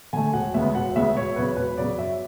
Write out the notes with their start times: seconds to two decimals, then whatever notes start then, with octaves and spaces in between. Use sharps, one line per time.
0.13 D3 A3 G#5
0.33 E1 F#5
0.54 D2 C#3 G#3 B3 E5
0.75 E1 F#5
0.96 D2 C#3 G#3 B3 E5
1.17 E1 C#5
1.36 E2 C#3 F#3 B4
1.57 E1 B4
1.77 E2 C#3 F#3 D5
1.98 F#2 E5